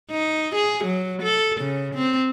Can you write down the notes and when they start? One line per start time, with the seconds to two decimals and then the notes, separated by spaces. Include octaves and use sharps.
0.11 D#4
0.55 G#4
0.84 F#3
1.23 A4
1.61 C#3
1.95 C4